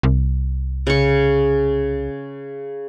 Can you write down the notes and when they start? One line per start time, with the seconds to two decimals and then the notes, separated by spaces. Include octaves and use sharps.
0.03 C2
0.87 C#3 C#6